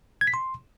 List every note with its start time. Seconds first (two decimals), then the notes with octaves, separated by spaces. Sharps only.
0.21 G#6
0.27 B6
0.34 C6